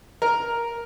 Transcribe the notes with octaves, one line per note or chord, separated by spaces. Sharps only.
A#4